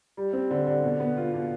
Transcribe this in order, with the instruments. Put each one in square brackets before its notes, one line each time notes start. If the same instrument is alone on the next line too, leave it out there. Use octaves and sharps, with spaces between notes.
[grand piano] G3
C4
D3
D3
B2
B3
F4
B2